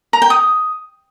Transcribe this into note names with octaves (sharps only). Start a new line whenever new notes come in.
A#5
G5
D#6